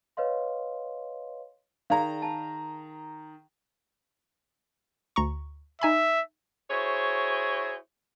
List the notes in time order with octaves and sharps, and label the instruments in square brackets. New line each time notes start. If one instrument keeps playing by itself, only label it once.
[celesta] B4 C#5 D#5 F5 C6
[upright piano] D#3 A#5 [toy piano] G#4 D5 F5
[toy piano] A5
[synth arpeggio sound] D2 A#5 C#6
[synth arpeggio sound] D#4 G#5 B5 [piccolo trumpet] E5
[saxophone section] E4 F#4 G#4 C5 C#5